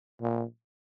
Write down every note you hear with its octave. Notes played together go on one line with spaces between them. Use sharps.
A#2